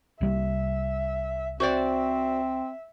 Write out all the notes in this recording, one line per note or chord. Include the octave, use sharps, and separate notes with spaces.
C2 G3 A#3 E5
C4 F#4 C5 D5 E5